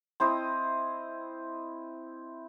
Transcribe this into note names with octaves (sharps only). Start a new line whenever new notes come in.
C4 E4 C5 D#5